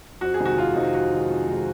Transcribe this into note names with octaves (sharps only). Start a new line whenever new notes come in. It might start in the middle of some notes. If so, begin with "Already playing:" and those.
F2 F#4
G#4
C3 D#3 G#3
F#4
F2 F4
C3 D#3 G#3 D#4
F2 F#4
C3 D#3 G#3
F2
C3 D#3 G#3